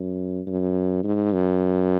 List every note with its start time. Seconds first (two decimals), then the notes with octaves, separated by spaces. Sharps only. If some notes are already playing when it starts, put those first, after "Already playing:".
Already playing: F#2
0.47 F#2
1.04 G#2
1.33 F#2